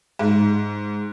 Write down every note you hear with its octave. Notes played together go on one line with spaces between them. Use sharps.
G#2